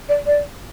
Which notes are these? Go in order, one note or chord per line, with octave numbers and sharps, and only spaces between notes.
D5
D5